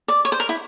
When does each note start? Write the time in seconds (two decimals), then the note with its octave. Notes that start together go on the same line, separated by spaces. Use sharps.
0.08 D5
0.25 C#5
0.32 C5
0.40 A#4
0.49 E4